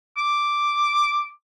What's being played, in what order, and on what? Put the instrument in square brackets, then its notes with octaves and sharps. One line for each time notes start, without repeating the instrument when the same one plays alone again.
[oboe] D6